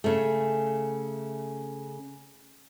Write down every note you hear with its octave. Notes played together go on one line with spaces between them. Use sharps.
C#3 A3